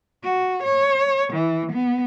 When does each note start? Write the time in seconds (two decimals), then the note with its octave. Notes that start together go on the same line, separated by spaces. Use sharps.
0.24 F#4
0.63 C#5
1.33 E3
1.72 B3